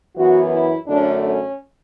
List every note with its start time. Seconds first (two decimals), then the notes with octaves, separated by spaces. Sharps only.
0.15 F#2 E3 B3 F#4
0.51 E4
0.86 F#2 D3 A3 C#4 D4
1.22 C#4